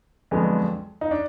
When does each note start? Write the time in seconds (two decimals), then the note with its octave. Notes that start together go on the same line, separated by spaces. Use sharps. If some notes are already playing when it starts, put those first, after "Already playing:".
0.31 F2 D3 F#3 G#3 B3
1.01 D#4
1.11 D4